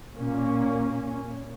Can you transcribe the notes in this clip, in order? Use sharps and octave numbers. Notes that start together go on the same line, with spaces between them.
A#2 A#3 C#4